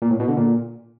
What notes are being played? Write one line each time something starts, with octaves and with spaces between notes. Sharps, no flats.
A#2
A2
B2
D3
A#2